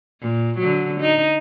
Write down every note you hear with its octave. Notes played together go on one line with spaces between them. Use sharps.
A#2
D3 F#3
D#4